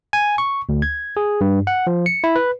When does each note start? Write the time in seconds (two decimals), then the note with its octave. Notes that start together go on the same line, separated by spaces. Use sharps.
0.13 G#5
0.38 C#6
0.69 D2
0.82 G#6
1.17 G#4
1.41 G2
1.67 F#5
1.87 F3
2.06 C#7
2.24 E4
2.36 B4